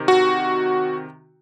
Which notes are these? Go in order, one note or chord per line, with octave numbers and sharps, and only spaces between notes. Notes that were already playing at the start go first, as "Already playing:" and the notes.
Already playing: C3 D#3
F#4